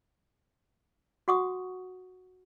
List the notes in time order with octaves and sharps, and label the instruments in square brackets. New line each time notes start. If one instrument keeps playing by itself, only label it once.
[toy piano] F#4 F#5 C#6 D#6